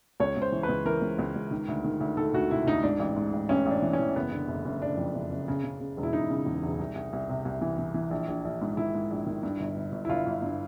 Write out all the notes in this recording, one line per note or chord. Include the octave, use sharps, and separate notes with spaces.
C#2 C#5
C#2 C5
E3
B4
C#2
E3 A#4
C#2
C#2
C#2
D#3
D2
D#3
D2
D#3 A4
D2 F#4
C3 E4
D2 D#4
G#2 D4
A1
G#2
A1
A1 C#4
A1 D4
E3
C#4
E3
F#1 B3
D3
F#1
F#1
F#1 D4
F2
F#1
F#1
C#3
C#3
C#3
E1
E4
E1 D#4
C#3
E2
E1
C2
C2
C2
C3
C2
E3
E3
E3
A#1
A#1
A#1
G#2
D#3 E4
G#2
A#1
D#3
G2
G1
G1
G1
E4
G1 F4
G1
G2